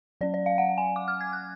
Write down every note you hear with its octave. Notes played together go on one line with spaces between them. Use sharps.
F#3 C#4 D5
D5
F5
F#5
G#5
D6
F6
G#6
F#6